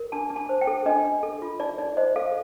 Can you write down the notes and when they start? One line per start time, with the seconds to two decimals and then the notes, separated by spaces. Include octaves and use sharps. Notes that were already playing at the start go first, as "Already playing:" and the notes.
Already playing: A#4
0.12 D4 A5
0.30 D4
0.36 A5
0.49 C5
0.61 G5
0.67 A4
0.86 D4 D#5
1.05 D4
1.23 A4
1.42 F4
1.60 D#4 D5
1.78 D#4 D5
1.97 C5 D#5
2.16 A4 F5